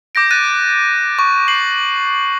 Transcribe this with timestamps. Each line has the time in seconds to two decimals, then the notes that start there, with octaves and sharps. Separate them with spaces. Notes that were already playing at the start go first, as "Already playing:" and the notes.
0.15 D6 G6 A#6 D7
0.31 F#6 A6 D#7
1.19 C#6
1.48 C7 F#7